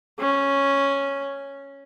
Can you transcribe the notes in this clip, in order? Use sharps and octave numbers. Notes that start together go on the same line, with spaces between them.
C#4